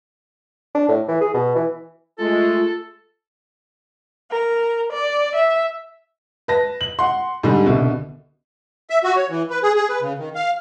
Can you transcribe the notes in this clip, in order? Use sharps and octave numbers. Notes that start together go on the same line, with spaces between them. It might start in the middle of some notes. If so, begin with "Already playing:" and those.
D4
A2
E3
G#4
B2
E3
G#3 A3 F4 A4
A#4
D5
E5
B4 A5 A#6
F#7
F#5 C6
G#2 D3 G3
C2 B2 D3
E5
F#4
C#5
E3
B4
G#4
G#4
B4
C#3
D#3
F5